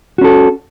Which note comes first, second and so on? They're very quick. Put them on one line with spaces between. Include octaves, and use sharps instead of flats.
F#4 C#4 A4